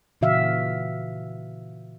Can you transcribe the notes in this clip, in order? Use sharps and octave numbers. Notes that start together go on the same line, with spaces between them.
A#2 C#3 E3 F#4 E5 F5